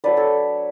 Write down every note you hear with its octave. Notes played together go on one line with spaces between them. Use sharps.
F#3 A3 D4 B4 D5
A4 C#5